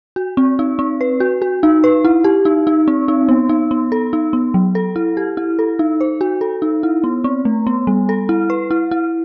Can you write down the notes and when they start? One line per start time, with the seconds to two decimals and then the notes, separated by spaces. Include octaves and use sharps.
0.16 F#4
0.37 C4
0.59 D#4
0.79 C4
1.01 B4
1.20 F#4
1.42 F#4
1.63 D#4
1.84 B4
2.05 E4
2.24 G4
2.45 D#4
2.67 D#4
2.88 C4
3.08 D#4
3.29 B3
3.49 D#4
3.71 B3
3.92 A4
4.13 D#4
4.33 B3
4.54 F#3
4.75 A4
4.96 E4
5.17 G4
5.37 E4
5.59 A4
5.79 D#4
6.01 C5
6.21 F#4
6.41 A4
6.62 D#4
6.83 E4
7.04 B3
7.24 C4
7.45 A3
7.67 B3
7.87 G3
8.09 A4
8.29 E4
8.50 B4
8.71 E4
8.91 E4